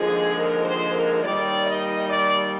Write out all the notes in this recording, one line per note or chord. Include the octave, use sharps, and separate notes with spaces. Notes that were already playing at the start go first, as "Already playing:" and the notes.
Already playing: D#2 D3 F3 G#3 G#4
A#4
C5
A#4
D#2 D#3 G3 D5
D#5
D5